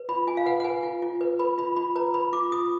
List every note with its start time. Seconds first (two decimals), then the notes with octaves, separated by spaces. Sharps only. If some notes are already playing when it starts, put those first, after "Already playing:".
Already playing: B4
0.09 F4 B5
0.27 F4 G#5
0.37 F5
0.46 B4 F#5
0.60 F#5
0.64 B4 G#5
0.83 F4
1.02 F4
1.21 B4
1.39 B4 B5
1.58 F4 B5
1.76 F4 B5
1.96 B4 A#5
2.14 B4 B5
2.33 F4 D6
2.52 F4 D#6